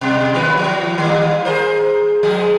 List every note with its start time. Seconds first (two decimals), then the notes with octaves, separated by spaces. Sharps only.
0.01 B2 G3
0.34 D#2 E3 B4
0.58 E3 F#3
0.98 D#3 G3 A#3
1.45 G#4 A#4 C5
2.23 F3 G#3 G#4